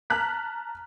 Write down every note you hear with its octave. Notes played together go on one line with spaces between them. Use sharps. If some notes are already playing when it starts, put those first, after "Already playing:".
A5 A#5 F6 F#6 B6